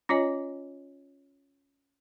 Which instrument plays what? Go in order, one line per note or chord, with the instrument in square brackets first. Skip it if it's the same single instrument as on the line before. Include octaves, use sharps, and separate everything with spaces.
[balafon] C#4 F4 C#5 D#5 G#5